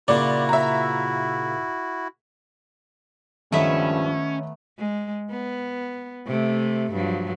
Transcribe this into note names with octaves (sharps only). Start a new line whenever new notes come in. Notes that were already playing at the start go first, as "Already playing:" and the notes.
A#2 C#3 E4 F#4 D5
E5 A#5
C#2 G2 D#3 F3 A3 B3 C#4 E5
G#3
B3
C3 A3
G2 F3 F#3